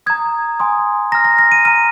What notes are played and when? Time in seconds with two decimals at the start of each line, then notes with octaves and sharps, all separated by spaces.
0.06 A#5 D#6 G#6
0.60 G#5 C6 D#6
1.12 A#5 F6 A#6
1.25 A#6
1.39 A#6
1.52 D#7
1.65 A#5 F6 D#7